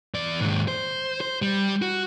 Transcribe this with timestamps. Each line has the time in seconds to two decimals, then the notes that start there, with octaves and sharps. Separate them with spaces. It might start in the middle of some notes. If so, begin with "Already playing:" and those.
0.14 E2 D5
0.42 D#2 G#2
0.68 C5
1.21 C5
1.42 G3
1.82 F#4